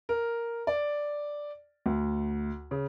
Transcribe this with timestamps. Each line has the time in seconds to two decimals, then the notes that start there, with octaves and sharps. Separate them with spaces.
0.09 A#4
0.67 D5
1.86 D2
2.71 C#3